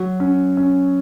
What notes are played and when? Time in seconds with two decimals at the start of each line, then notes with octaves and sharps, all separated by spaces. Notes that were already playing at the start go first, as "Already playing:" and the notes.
Already playing: F#3
0.20 C#4
0.57 C#4